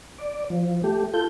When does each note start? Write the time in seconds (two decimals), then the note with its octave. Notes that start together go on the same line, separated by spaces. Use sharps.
0.18 D5
0.50 F3
0.84 A3 G4
1.14 F4 A4 G6